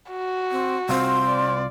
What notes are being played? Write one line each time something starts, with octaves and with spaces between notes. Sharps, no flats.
F#4
C4
C2 C4 F4
D5